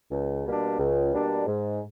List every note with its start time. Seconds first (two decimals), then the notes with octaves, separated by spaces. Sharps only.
0.11 C#2
0.45 B2 G3 A#3 D4
0.79 C#2
1.12 B2 G3 A#3 D4
1.46 G#2